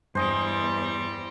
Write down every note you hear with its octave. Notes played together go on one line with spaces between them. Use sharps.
E2 G2 G3 C5 D#5 G#5